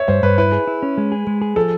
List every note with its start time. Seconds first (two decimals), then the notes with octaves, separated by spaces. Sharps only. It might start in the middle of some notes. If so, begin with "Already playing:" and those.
Already playing: C#5 E5
0.08 G2 C5
0.23 G2 B4
0.38 E4 B4
0.52 G#4
0.67 E4
0.83 C#4
0.98 G#3
1.12 G#4
1.27 G#3
1.42 G#4
1.56 F3 A4